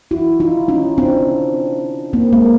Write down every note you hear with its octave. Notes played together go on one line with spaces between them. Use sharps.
E4 F#4
D#4 F4
C#4 D#4
C4 D4
A#3 C4
G#3 A#3